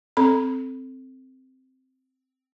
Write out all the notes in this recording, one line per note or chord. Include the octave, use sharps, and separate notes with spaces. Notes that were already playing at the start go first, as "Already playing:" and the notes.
C4 A4 B5